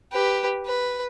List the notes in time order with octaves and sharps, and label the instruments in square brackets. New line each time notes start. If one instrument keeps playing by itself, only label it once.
[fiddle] G4 B4
B4